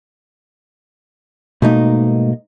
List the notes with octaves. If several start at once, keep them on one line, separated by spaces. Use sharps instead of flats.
G#2 B2 A3 A#3 D#4